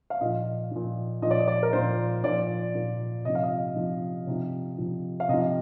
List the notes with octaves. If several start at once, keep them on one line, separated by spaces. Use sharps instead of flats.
F5
A#2 F3 D#5
A#2 F3
A#2 F3 D#5
D5
D#5
D5
A#4
A#2 F3 C5
A#2 F3 D5
A#2 F3
C3 F3 D#5
F5
D#5
C3 F3
C3 F3
C3 F3
F5
C3 F3 D#5